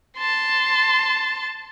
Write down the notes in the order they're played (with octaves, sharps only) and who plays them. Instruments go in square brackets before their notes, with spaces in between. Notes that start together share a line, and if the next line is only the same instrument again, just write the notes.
[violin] A5 C6